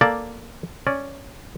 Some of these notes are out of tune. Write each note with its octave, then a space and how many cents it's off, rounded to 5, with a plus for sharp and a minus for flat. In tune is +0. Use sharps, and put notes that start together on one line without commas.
A#3 +0 A4 +0 D5 +0
C#4 +0 D5 +0